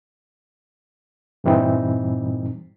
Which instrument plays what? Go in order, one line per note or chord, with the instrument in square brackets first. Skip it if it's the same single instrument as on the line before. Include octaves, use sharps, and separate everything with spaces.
[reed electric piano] G2 A#2 E3 G3 C4 D#4